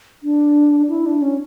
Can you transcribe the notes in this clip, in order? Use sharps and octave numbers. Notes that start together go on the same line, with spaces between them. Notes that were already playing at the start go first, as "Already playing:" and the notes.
D4
E4
D4
C#4